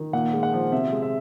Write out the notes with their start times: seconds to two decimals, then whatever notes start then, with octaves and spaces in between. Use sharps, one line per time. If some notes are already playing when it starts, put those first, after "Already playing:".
Already playing: D#3
0.13 A#2 F#5
0.33 G#3
0.43 F#5
0.52 F3
0.72 C3 E5
0.92 G#3
1.02 E5